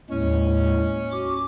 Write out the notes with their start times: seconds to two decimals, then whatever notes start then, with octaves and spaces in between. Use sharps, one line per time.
0.10 D#2 A2 G#3 C#4
1.12 F#4 D6